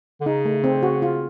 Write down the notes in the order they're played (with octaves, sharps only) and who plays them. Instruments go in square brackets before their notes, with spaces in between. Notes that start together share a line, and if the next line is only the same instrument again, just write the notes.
[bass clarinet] D3
[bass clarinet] C#3 [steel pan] D#4
[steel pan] A3
C4
F#4
F4